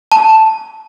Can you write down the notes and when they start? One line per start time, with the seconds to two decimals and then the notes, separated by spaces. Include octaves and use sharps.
0.12 A5